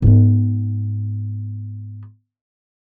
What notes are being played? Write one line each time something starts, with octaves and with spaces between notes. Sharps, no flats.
G#2 B3